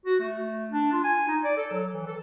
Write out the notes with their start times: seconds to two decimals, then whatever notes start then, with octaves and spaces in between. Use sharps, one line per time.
0.06 F#4
0.20 A3
0.71 D4
0.92 F4
1.04 G#5
1.28 D#4
1.44 D5
1.57 A4
1.72 F#3
1.94 E3
2.07 A4